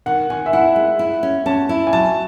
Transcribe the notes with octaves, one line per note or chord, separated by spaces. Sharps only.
D#3 F#5
D#3 G#5
E5
E4 F#5
G#3
E4
C#4
C#4 A5
E4
G#5
F#3 A5